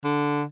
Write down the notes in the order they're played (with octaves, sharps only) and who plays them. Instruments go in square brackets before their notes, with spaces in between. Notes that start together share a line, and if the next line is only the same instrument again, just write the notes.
[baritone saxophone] D3